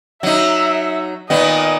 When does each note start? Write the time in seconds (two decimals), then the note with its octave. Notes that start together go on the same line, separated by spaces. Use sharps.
0.23 F#3 D#4 E5
1.30 A#2 D#3 B3 D#5